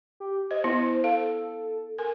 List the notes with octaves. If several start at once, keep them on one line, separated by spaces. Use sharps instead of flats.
G4
C5 D#5
B3 E4 C5
A4 F5
A#4 G#5